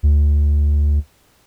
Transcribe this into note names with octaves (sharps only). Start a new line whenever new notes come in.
D2